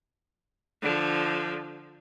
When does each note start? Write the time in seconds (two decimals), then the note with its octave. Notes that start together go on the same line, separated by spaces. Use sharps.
0.82 D3 F3